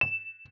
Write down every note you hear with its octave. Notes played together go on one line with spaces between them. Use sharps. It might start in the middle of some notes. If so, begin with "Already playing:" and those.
E7